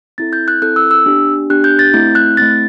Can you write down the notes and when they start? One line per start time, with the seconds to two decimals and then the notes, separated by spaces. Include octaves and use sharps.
0.18 C4 E4 A4 A6
0.33 G6
0.48 F#6
0.62 C4 E4 A4 F#6
0.76 E6
0.91 E6
1.06 B3 D4 G4
1.50 B3 D4 G4 F#6
1.64 G6
1.79 A6
1.94 A3 C4 E4 G6
2.15 F#6
2.37 A3 C4 E4 A6